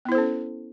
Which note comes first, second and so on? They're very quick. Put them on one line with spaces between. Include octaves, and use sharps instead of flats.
B3 E4 C5 A4 C#4